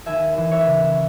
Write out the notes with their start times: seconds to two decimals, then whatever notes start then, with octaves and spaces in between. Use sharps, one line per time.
0.06 D#2 E5 G#5
0.37 E3
0.51 C#5 E5
0.66 C#3